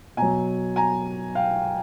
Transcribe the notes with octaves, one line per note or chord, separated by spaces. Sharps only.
B2 F#3 G#5 A#5
G#5 A#5
F5 G5